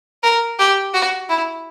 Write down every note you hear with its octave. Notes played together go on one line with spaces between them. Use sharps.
A#4
G4
F#4
E4